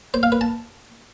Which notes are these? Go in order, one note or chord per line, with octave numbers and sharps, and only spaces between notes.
C5
F5
B4
A5